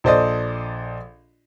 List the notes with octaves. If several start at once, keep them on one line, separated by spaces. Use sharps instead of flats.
A#1 A4 C5 D5 D#5 D#6